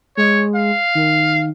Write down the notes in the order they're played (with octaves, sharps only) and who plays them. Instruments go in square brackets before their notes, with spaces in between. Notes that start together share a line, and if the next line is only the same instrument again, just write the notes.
[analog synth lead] G#3 [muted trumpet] C#5
[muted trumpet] F5
[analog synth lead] D#3